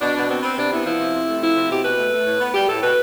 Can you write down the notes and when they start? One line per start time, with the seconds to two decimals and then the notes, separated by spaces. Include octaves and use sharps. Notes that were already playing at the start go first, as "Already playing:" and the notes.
0.01 B2 D4
0.16 B2 B3
0.29 B3 C4
0.43 B3 C4
0.58 C3 D4
0.71 B3 E4
0.86 F3 E4
1.00 C3
1.14 C3
1.28 A3
1.42 F3 E4
1.56 C3
1.70 B2 G4
1.84 B2 B4
1.98 A3
2.13 A3
2.26 A2
2.41 B3
2.54 G3 G4
2.68 A2 A4
2.82 B2 B4